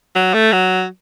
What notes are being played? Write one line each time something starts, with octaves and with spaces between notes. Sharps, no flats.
F#3
A3
F#3